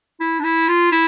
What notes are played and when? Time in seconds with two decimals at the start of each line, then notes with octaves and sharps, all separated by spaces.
0.20 E4
0.39 D4
0.44 E4
0.68 F4
0.92 E4